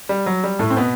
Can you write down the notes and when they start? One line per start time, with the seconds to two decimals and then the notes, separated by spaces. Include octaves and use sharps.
0.09 G3
0.26 F#3
0.44 G3
0.59 A2 A3
0.70 C4
0.77 B2 B3